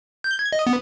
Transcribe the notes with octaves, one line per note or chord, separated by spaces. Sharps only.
G6
G#6
D#5
B3